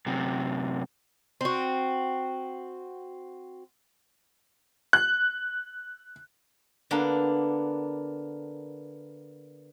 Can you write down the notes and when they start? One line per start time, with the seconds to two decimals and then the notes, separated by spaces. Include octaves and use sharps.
0.06 F#2 C3
1.41 C4 F#4
4.93 F#6
6.91 D3 A#3 B3 D4